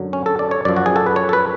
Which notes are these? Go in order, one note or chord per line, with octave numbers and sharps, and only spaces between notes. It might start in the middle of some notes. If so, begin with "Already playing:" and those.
Already playing: F#2 D3 F#3
C#4
A4
D5
C#5
F#2 F3 D5
F#4
G#4
A4
B4
C#5
A4
B4